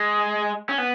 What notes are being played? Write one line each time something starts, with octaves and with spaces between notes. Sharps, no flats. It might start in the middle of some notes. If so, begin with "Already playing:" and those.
Already playing: G#3
C#4
B3